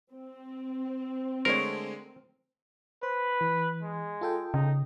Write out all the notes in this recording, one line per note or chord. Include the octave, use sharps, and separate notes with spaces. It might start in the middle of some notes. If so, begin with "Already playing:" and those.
C4
D3 G#3 A3 A#4 C5 C#5
B4 C5
E3
G#3
F4 A4 G5
C#3 D#4